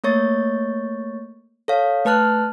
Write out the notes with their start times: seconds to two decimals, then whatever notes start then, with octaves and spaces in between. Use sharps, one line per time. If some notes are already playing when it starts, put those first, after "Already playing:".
0.04 A3 A#3 C#5 C#6 A6
1.68 A4 C#5 F5
2.05 A3 B4 A5 F6 F#6